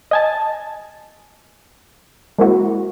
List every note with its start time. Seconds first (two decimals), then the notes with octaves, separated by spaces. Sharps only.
0.11 D#5 G#5 A5
2.38 G#3 A#3 C4 E4 F#4